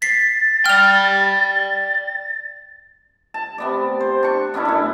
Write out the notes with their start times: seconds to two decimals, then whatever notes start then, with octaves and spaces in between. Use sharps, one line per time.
0.02 A6 B6 C7
0.66 D5 G5 F6 F7
3.34 A5
3.58 C3 B3 D5
4.00 C5
4.23 D4 C#6
4.54 B3 C#4 D4 E4
4.65 F#2 A3